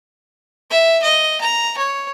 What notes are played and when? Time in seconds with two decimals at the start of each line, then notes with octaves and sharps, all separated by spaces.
0.70 E5
1.03 D#5
1.41 A#5
1.78 C#5